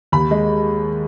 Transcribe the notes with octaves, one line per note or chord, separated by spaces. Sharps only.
D#2 B5
G#3